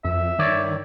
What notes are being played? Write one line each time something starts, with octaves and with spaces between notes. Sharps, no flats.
F2 E5
G2 D#3 C#5 D5